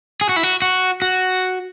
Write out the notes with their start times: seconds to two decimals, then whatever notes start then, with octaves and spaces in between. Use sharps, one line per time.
0.21 G#4
0.29 F#4
0.36 E4
0.43 F#4
0.62 F#4
1.02 F#4